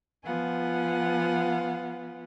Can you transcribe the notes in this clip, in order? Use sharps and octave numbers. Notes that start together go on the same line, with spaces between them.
F3 B3 F4 F5 F#5 G#5